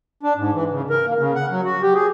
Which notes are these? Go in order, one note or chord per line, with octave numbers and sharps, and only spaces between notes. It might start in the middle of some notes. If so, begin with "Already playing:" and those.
D4
G#2
E3
C#3
A#4
A#3
C#3
F#5
F#3
F#4
G4
G#4